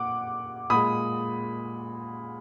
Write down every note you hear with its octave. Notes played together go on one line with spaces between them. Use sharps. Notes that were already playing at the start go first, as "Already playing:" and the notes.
Already playing: A#2 F#5 D6
A#2 G#3 B5 D#6